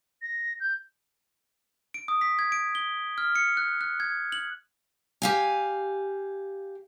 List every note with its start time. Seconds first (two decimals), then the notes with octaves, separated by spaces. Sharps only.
0.22 A#6
0.60 G6
1.94 D7
2.08 D#6
2.21 B6
2.39 G#6
2.52 D7
2.75 G7
3.18 F6
3.36 C#7
3.57 F#6
3.81 F#6
4.00 G#6
4.32 F#7
5.22 G4 F5 G#5